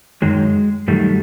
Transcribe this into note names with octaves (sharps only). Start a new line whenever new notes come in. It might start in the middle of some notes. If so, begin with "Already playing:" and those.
F#2 D#3 F#3 G#3
F#2 D#3 F#3 G3 A3